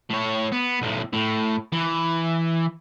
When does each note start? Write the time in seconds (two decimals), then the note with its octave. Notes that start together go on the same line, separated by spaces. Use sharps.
0.10 A2 C#5
0.52 B3
0.82 B1 A2
1.13 A2
1.72 E3